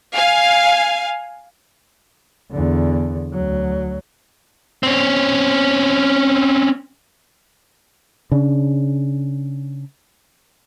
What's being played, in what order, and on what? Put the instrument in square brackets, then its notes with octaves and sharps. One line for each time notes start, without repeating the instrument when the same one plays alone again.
[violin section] F5 G#5
[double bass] E2 D3
D2 F#3
[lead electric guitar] C4 C#4
[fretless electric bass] C#3 D4